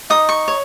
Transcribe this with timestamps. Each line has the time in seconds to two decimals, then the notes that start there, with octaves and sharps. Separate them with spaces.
0.10 D#4 D#6
0.29 C#6
0.48 C#5